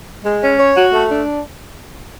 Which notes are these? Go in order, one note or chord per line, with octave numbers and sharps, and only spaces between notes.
G#3
C#4
C#5
F#4
A3
D4